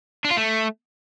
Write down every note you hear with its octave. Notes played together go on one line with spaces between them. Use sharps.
D4
F4
A3